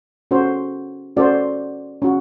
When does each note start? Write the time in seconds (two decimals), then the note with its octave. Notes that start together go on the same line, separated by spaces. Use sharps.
0.31 C#4 F#4 A4 C5
1.17 C#4 F#4 A4 C5 D5
2.02 C#4 F#4